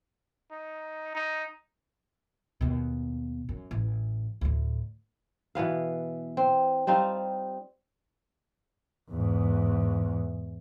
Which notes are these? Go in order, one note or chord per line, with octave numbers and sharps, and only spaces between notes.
D#4
D#4
D#2 B2
F#2
A1
D2 A2
B2 E3 B3 F5
C4
G3 C4 D#4 F4
E2 G#2